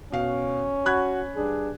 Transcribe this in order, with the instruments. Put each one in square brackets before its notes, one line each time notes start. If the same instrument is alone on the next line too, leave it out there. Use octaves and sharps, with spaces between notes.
[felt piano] B2 F5 [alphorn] C#4
[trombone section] F#4 [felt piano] B5 F#6 G#6
[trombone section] G2 D4 G#4